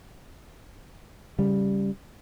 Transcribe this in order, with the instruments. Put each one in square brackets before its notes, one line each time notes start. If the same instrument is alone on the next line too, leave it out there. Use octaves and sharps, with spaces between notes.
[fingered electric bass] C#3 G3